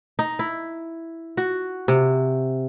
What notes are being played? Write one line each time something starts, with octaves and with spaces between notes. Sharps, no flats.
D#4
E4
F#4
C3